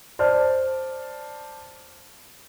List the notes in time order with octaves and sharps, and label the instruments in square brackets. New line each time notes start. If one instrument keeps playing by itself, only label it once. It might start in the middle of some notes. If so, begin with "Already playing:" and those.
[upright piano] C5 D5 A5 F6